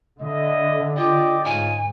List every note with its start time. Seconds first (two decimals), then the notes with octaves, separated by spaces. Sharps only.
0.22 D3 E4 D#5
0.97 F4 G4 D5 D#5
1.44 G#2 C#4 D#4 F4 G#5